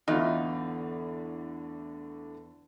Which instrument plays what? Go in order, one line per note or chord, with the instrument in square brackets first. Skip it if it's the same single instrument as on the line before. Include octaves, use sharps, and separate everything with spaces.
[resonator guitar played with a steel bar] E2 [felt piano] A2 D3 [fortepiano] D#4 F4